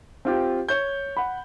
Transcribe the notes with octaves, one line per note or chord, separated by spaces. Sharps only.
C4 F4 G4
C#5 G6
F#5 B5